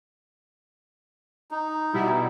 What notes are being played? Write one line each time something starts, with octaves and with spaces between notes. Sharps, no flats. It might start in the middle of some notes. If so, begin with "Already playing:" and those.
D#4
B2 G3 E4